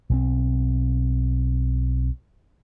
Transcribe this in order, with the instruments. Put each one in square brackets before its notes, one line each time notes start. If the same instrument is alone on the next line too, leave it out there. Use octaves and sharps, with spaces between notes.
[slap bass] B1 F#3 C4